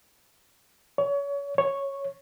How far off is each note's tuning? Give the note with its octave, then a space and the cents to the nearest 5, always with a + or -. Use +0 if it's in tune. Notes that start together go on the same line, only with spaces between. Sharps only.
C#5 +30
C#5 -5